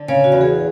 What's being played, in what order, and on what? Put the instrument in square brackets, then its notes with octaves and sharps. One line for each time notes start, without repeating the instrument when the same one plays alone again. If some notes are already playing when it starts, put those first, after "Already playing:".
Already playing: [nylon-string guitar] D3
[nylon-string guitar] C#3 [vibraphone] C#5
[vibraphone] F#4
[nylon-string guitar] E2
[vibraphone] G#4